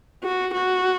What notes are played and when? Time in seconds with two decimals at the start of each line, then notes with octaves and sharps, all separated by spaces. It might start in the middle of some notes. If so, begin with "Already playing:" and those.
0.25 F#4
0.54 F#4